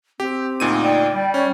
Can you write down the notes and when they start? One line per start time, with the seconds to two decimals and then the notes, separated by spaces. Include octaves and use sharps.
0.20 C4 G4
0.60 D2 A#2 D#4 D#7
0.82 D5 G5
1.14 G3
1.34 C#4 C#5 D5